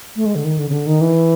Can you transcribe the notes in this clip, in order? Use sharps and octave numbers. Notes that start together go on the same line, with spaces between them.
A3
G#3
D3
D#3
D3
C#3
D3
D#3
E3